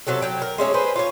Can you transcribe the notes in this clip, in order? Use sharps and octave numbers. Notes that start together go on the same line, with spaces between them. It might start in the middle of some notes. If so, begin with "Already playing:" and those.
C3 F#3 F#4 A4
F#3 G5
A#4
G#3 A3 C#4 G#4
G#4 B4 C5
F4 C#5